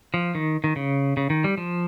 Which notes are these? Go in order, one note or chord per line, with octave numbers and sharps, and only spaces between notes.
F3
D#3
D#3
C#3
C#3
D#3
G3
F3